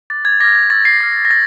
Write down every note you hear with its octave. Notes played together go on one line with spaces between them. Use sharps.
D6 F#6 A6
G#6
A6
D6 F6 A#6
G#6
C#6 E6 G6 A6
C7
D6 F6 A#6
A#6
C#6 A6